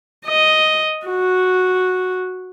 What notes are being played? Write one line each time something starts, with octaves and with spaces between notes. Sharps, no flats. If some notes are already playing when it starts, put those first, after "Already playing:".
D#5
F#4